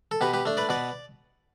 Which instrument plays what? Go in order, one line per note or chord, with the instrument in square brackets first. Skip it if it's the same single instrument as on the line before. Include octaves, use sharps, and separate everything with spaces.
[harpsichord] A4
B2 G4 B4
G4 B4
A3 D4
B4 D5
B2 B4 D5